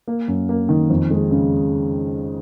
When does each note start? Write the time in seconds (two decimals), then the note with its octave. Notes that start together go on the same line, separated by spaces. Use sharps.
0.08 A#3
0.28 F#2
0.49 A#3
0.69 D#3
0.90 F2
1.11 G#3
1.31 C#3